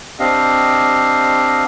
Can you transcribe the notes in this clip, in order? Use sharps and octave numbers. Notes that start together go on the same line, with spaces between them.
C4 D4 G4 D#5 F5